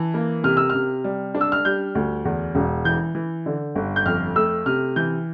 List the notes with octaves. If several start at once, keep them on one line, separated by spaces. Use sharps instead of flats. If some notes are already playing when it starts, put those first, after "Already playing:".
Already playing: E3 A5
A#3
C3 F6
E6
C3 F6
G3
D4
E6
F6
G3 G6
D2
E2
E1
E3 G6
E3
D3
G1
G6
F2 F6
A3 E6
C3 F6
E3 G6